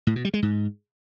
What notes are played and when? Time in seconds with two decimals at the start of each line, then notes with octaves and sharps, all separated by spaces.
0.07 A2
0.16 B2
0.25 G3
0.34 G#3
0.42 G#2